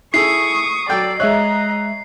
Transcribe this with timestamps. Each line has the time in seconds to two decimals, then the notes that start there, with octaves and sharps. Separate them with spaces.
0.14 E4 G#4 A4 C#6 D#6 C7
0.89 F#3 A4 D5 G5 E6
1.20 G#3 C#5 D#5 E5 A#5 F#6